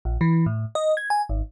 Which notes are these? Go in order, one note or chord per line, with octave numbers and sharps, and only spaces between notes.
A#1
E3
A2
D#5
G#6
G#5
G#1